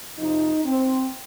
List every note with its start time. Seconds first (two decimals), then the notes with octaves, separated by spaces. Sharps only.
0.18 F2 C3 F3 D#4
0.65 C4